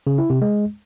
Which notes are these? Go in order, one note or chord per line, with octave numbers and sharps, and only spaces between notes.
C#3
E4
C3
G#3